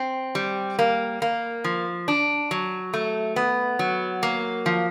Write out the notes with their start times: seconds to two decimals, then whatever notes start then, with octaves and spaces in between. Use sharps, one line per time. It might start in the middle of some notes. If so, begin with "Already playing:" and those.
Already playing: C4
0.35 G3
0.79 A#3
1.22 A#3
1.64 F3
2.08 D4
2.51 F#3
2.94 A3
3.36 B3
3.79 F#3
4.23 A#3
4.66 F3